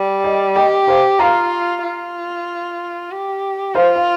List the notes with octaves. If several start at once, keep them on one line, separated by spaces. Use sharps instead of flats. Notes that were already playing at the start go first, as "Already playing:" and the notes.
Already playing: G3
D#5 G5
G4 D#5 G5
C5 F5
F4 F5 A#5
F4
G4
F4 C5 F5
F5